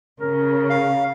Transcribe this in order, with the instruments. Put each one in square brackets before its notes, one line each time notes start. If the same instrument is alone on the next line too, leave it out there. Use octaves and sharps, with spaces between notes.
[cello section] C#3 [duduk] A#4
[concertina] F5